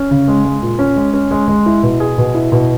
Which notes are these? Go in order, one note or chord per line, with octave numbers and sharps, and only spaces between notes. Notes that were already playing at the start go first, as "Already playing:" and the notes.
Already playing: C#4
C#3
G#3
G#3
A#2
C#4
G#3
C#4
G#3
G#3
E4
B2
G#4
B2
E4
B2